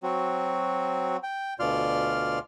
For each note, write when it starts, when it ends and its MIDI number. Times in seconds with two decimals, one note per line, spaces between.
0.03 1.17 54
0.03 1.17 60
0.03 1.17 66
1.23 1.54 79
1.59 2.39 38
1.59 2.39 47
1.59 2.39 65
1.59 2.39 74
1.59 2.39 84
1.59 2.39 89